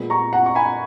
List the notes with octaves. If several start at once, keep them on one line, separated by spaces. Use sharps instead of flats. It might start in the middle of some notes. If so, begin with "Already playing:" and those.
Already playing: A#2 G#3 B3
A#5 C#6
F#5 A#5
C#6
G#5 B5